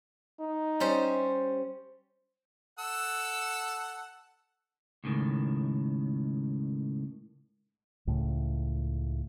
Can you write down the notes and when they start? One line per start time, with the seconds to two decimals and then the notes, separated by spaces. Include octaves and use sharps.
0.40 D#4
0.80 G3 C#4 C5
2.79 A4 F#5 E6
5.04 C#2 A2 D#3
8.07 C#2 A2